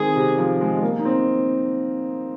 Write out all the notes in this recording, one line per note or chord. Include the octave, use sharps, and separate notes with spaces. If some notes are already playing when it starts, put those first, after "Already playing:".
Already playing: D#3 G#3 C4 G#4
C3
F3
G#3
G#3
A#3
D#4
C4